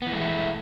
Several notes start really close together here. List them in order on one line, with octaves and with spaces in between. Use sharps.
B3 E3 G#3 A3 E4